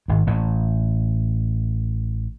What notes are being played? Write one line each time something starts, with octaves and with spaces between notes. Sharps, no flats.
G#1 G#2
A1 A2